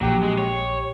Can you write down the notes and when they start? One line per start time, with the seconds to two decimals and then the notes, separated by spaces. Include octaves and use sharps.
0.01 A#1 F#3 G4
0.23 G#3
0.38 C#5